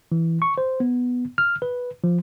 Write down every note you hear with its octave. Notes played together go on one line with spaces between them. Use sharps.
E3
C#6
C5
B3
F6
B4
F3